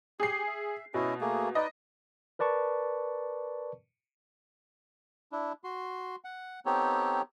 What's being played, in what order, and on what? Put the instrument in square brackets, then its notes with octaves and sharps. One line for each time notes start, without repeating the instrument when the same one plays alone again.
[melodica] G4 [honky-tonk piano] G#4 C7
[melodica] E5
[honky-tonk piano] B2 [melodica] C#4 E4 D#5
[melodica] A3 A#3 G#4
[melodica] D#4 B4 D5 [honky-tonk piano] D#5
[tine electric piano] A#4 B4 D5 A5 C#6
[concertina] D4 E4
F#4 C6
F#5
B3 C4 D#4 G4 A4 C#5